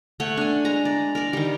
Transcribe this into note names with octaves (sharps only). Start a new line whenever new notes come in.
A3 C#5 F#5
D4 G#5
G#3 A#5
D5
A#4 D5
D#3 G3